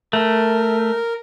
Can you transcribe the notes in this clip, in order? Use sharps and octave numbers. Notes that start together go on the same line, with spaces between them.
A3 A#4